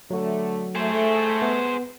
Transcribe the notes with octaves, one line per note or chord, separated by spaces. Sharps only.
D3 F#3 A3 F#4
A3 G#4 C5
B3